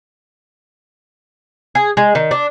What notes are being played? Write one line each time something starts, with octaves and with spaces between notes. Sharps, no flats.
G#4
G#3
D#3
D4